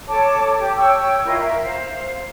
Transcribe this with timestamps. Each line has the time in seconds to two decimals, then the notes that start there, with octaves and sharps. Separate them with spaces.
0.07 A4 C#5 A5 D6
0.58 G4 D6
0.76 C#5 G5 C#6 E6
1.24 E4 F4 A#4 D#5
1.38 A#4 E5
1.62 C5 F5